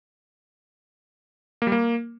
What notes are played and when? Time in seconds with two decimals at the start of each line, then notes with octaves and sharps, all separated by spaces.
1.62 A#3
1.67 G3
1.72 A#3